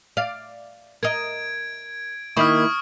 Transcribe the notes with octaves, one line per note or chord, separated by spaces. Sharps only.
D5 F5
A#4 D#5 G#6 D7
D#3 A#3 E4 C#6 D#6 F6